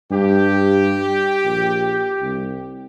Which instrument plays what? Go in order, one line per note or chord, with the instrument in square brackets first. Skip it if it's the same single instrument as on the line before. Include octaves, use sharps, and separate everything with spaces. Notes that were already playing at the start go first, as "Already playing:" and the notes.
[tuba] G2 [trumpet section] G4
[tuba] A#1
C2